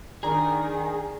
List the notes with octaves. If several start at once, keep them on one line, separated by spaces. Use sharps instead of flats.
D#3 D4 G#4 A#5